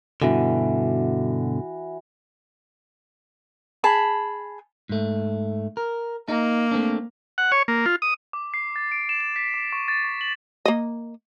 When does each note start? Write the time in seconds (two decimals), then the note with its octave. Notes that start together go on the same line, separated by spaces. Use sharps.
0.22 G2 B2 D3 E3 F#4
3.84 G#4 A5 B5
4.89 G#2 A3
5.77 A#4
6.28 A#3 D#4
6.71 A3 C4 D4
7.38 F#5
7.52 C#5
7.68 A#3
7.86 F4
8.02 D#6
8.33 D6
8.54 C7
8.76 A6
8.92 D7
9.09 E7
9.21 E7
9.36 B6
9.54 D6
9.72 C#6
9.88 A6
10.04 C#6
10.21 F#7
10.65 A#3 D#5